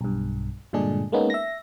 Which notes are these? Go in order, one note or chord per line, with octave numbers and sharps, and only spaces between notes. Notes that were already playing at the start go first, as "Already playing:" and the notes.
B1 G2
G2 A#2 D3 G#3 D4 G#4
G#3 A#3 B3 C#4 D#4
E5 A#6